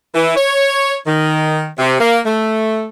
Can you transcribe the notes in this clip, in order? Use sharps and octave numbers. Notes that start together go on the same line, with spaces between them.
E3
C#5
D#3
C3
A#3
A3